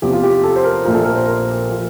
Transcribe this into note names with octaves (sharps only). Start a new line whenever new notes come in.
E2 C3 F3 G4
F4
G4
A4
C5
A#4
A#1 A#2 F3 A#4
A4
A#4
C5
A#4
F3